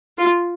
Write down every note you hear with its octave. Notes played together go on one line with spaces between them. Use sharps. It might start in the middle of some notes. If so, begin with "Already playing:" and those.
F4